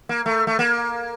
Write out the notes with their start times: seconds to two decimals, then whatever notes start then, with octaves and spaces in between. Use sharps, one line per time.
0.09 A#3
0.26 A3
0.47 A3
0.59 A#3